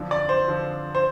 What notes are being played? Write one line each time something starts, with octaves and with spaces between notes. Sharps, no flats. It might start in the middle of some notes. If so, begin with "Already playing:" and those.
Already playing: F2 D3 F3
D5
C5
F2 D3 F3
C5